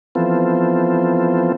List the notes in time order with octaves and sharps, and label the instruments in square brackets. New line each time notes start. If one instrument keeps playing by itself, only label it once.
[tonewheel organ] E3 F3 B3 C4 F4 A4